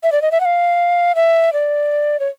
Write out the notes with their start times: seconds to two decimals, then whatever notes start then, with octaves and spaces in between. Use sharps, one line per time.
0.03 E5
0.12 D5
0.22 D#5
0.31 E5
0.40 F#5
0.45 F5
1.16 E5
1.53 D5
2.20 C#5